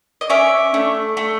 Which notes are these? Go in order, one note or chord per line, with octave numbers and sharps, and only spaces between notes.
D#5
C#4 D5 E5
A3
A3